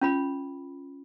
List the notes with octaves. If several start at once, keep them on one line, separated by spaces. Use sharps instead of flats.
C#4 F4 B5